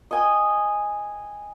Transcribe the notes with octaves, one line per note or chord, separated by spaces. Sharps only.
D#5 G5 G#5